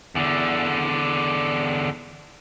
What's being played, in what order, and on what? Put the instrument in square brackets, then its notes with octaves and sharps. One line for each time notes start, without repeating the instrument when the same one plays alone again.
[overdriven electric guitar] E2 D3